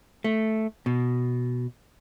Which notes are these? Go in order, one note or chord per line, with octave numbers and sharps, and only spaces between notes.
A3
B2